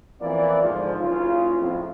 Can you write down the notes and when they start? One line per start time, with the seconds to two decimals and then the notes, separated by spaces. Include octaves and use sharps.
0.20 F2 E3 A#3 B3 D5
0.62 G#2 D3 F3
0.99 F#1 C#3 F4
1.59 F2 A2